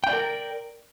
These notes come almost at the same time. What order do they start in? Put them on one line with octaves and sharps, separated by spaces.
G5 D5 A#4